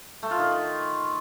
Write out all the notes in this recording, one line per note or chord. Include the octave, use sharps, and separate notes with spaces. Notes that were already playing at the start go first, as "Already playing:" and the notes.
A3
F4
D#3